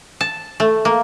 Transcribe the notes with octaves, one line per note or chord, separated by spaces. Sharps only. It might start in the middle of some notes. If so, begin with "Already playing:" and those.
A5
A3
A#3